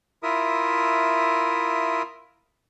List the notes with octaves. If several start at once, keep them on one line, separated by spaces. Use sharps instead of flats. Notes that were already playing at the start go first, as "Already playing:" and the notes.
E4 F4 A#4 E5 D#6